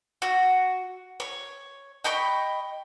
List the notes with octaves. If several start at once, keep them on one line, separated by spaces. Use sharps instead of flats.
F#4
C#5
D#5 G5 B5 C#6